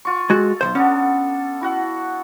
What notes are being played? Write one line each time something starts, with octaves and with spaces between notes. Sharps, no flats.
F4 C#6
G#3 F#4 A4
B1 A#2 C5
B3 C#4 D4 A4
E4 F#4 F#5